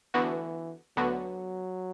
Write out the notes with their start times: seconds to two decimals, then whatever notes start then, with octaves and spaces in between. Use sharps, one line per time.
0.14 D2 D3 E3 B3 F#4
0.97 D2 D3 F#3 B3 F#4